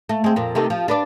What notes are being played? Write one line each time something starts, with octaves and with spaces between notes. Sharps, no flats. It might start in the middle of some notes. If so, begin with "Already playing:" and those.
A3
G#3 C4
F2 A#2
C3 D#3 A3
F3
D4 B4 D5